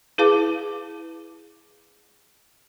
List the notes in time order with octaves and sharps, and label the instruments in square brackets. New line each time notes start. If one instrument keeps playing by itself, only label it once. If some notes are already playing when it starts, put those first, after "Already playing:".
[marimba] E4 G#4 B4 F5 A5 D6